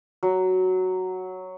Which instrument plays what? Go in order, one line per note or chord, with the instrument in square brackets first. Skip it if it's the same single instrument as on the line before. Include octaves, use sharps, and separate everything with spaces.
[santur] F#3